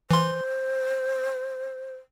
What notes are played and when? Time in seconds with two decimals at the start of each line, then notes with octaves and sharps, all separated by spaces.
0.11 E3 C5 C6